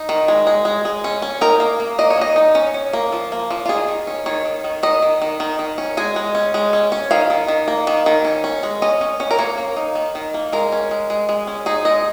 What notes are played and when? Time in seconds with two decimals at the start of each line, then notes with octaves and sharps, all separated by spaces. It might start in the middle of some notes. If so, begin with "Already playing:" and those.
Already playing: D#4
0.09 D#3
0.28 G#3
0.47 G#3
0.65 G#3
0.85 G#3
1.04 C#4
1.22 C#4
1.41 D#4 A#4
1.60 A#3
1.80 A#3
1.99 A#3 D#5
2.10 C#5
2.18 D#3 D#5
2.36 D#4
2.55 C#4
2.74 C#4
2.93 A#3
3.12 F3
3.32 A#3
3.50 F3
3.66 F4
3.69 D#3 G#4
3.88 D#3
4.07 C#4
4.26 D#3 C#5
4.45 D#3
4.64 D#3
4.83 D#3 D#5
5.02 D#3
5.22 D#3
5.40 D#3
5.59 D#3
5.78 C#4
5.97 G#3 G#5
6.16 G#3
6.35 C#4
6.54 G#3
6.73 C#4
6.92 C#4
7.11 D#3 F5
7.30 D#3
7.48 D#3
7.68 A#3
7.87 D#3
8.06 D#3
8.25 C#4
8.44 C#4
8.63 G#3
8.82 C#4 D#5
9.01 C#4
9.20 C#4
9.31 A#4
9.39 A#3 C#5
9.58 A#3
9.77 D#4
9.95 D#3
10.15 D#3
10.34 A#3
10.53 G#3 A#4
10.72 C#4
10.91 G#3
11.10 G#3
11.29 G#3
11.47 C#4
11.66 D#4 G#4
11.85 G#3 D#5